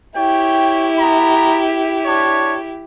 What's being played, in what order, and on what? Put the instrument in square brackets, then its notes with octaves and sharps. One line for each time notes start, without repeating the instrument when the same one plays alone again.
[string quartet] E4 G4 [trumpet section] C#5 G5
[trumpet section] B3 A#5
D4 C#5